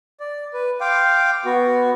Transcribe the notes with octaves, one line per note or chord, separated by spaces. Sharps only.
D5
B4
F5 G5 C6 D6
B3 F#4